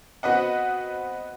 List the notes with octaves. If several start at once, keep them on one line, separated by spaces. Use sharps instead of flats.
B3 C4 F#4 B4 D#5 F#5